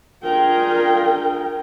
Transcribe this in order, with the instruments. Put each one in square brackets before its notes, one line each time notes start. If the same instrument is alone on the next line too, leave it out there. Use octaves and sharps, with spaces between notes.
[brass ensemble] D4 F4 G#4 [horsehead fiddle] A#4 G5